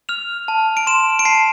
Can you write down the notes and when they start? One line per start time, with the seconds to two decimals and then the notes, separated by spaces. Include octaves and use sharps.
0.09 F6 F7
0.48 A5
0.77 D7
0.87 C6 E7
1.19 D7
1.25 A5 C7